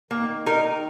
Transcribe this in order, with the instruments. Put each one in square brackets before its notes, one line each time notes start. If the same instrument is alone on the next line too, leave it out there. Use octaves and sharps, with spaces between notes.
[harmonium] D#3 [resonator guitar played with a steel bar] A#3
[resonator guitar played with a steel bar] D#4 A#4